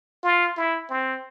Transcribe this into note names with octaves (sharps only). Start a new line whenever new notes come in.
F4
E4
C4